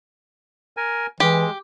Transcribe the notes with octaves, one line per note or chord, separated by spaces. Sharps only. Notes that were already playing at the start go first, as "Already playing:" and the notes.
A#4 G#5
E3 G#3 G4